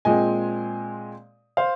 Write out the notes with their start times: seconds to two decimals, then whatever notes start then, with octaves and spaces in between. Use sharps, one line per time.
0.05 A#2 G#3 C4 D#5 G#5
1.57 C5 F5